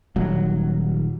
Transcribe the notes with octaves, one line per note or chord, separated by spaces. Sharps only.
D#1 F#3